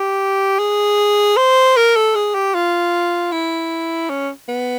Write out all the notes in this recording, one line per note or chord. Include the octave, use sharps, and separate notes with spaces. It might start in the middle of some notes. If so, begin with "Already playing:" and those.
Already playing: G4
G#4
C5
A#4
A4
G#4
G4
F4
E4
C#4
B3